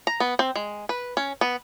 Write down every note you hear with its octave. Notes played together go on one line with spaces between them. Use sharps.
A#5
B3
C4
G#3
B4
C#4
B3